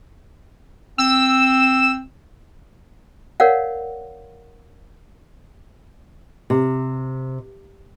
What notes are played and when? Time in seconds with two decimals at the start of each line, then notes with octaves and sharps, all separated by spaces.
0.98 C4 E6
3.40 A#4 C#5 D5 F5 F#5
6.50 C3